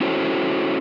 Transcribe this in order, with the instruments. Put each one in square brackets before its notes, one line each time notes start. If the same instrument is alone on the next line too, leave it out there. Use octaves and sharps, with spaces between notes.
[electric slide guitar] C#4 E4 F#4 A4 C5 C#5